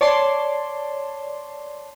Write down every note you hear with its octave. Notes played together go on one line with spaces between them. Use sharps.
C#5 D5 A5 C6